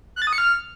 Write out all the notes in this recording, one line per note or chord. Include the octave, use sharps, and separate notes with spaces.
F#6
A6
D#6
C#7
F6